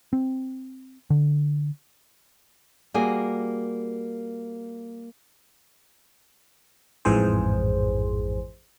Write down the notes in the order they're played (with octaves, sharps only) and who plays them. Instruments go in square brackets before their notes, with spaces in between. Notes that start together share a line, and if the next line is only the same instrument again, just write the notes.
[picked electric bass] C4
D3
[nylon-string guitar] G3 A#3 F#4 G#4
[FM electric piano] A1 F2 G#2 E3 G#4 C5